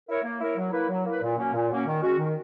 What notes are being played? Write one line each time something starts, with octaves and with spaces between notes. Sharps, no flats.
E4 A#4 C#5
A#3
E4 A#4 C#5
F#3
A#3 E4 B4
F#3
A#3 E4 B4
A#2
F#3 A#3 C#4
A#2
F#3 A#3 C#4
D#3
G#3 C#4 F#4
D#3